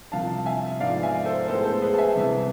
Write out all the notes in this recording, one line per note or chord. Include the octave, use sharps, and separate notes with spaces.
C2 C3 F3 F5 A5
E5 G#5
G#2 F3 B3 D5 F5
E5 G#5
A4 C5
A2 G#3 B3 A4 C5
A4 C5
G#4 B4
A5
E5 G#5
C2 C3 E3